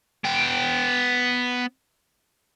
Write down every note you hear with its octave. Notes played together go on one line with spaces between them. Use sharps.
B3 G5